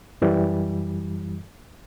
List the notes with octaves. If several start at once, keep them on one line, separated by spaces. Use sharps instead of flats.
F#2 E3 G3